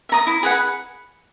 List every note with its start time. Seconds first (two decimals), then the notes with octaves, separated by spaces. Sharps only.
0.09 E5 A#5 D#6
0.27 E4
0.43 G#4 B4 F#5